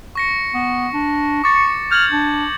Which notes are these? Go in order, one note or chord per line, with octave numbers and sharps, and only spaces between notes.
C#6 A#6 C#7
B3
D4
C#6 D6 A6 C#7
F6 G6 G#6 F#7
D4